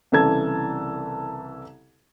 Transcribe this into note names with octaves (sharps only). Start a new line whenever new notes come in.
C2 C#3 E3 A4 A5 G#6